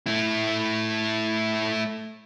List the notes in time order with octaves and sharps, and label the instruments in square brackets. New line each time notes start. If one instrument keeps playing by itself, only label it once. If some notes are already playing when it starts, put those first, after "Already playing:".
[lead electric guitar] A3 E4